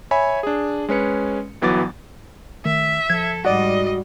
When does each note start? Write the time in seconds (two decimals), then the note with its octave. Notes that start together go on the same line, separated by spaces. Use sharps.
0.11 C#5 E5 G#5 B5
0.43 D4 G#4
0.89 G#3 C#4 B4 C#7
1.62 G1 E3 F#3 B3 D6 A6
2.65 D#3 A3 E5
3.10 F3 A4 G#6
3.45 G#2 G3 F#4 D5 D#5